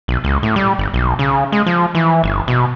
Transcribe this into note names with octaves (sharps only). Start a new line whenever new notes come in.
B1
C#2
A2
G3
G1
B1
C#3
G#3
F3
E3
G1
B2